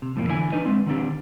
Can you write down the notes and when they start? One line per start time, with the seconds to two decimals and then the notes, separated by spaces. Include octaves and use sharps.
0.02 C3
0.16 F2 A2 F3 A3 A#3
0.27 D3 E3 E4 D5 G#5
0.52 D4 D#4 B4 D#5
0.64 G#3 C4 D4
0.86 D#3 B3 C4 D4 G4